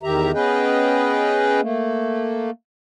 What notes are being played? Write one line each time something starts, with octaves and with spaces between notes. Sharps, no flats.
E2 D#3 G4 E5 A#5
B3 C#4 G#4 B4 D#5 G5
A3 A#3